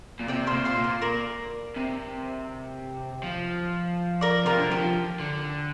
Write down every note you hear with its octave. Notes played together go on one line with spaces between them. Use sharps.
A#2
C3 D5 G5
C5 F5
A#2
C5 F5
A#2
C5 F5
A#4 D5
C3
F3
A#4 D5
C3 F4 A#4
D3
F3 G4
D3